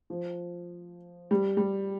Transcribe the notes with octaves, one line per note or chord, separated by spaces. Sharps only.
F3
G3
G3